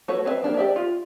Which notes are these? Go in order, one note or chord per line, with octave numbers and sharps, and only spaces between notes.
A3 F#4 B4 C#5
C4 B4 D5 E5
A#3 D4 G4
G4 D5 E5
F4